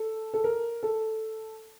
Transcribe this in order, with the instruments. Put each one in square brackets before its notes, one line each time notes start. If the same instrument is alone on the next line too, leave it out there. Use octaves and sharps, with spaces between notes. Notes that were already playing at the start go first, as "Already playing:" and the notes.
Already playing: [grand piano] A4
A4
A#4
A4